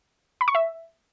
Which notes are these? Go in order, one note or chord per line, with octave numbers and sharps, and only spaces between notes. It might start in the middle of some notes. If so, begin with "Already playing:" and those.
B5
C#6
E5